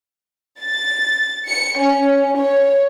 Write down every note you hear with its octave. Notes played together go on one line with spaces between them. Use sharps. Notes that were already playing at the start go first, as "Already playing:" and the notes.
A6
C#7
C#4
C#5